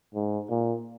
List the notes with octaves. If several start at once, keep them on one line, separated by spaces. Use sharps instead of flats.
G#2
A#2